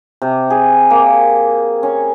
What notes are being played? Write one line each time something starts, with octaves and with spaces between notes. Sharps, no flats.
C3
G#4
A#3
C#4